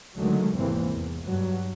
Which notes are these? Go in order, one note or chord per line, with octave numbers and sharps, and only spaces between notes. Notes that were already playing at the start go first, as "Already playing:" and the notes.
C#2 D3 D#3 F#3 G#3 A3
G#1 E2 C3 E3 A#3 C4
E2
G2 F#3